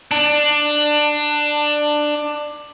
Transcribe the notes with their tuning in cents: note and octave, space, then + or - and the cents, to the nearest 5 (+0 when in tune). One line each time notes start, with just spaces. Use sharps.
D4 +15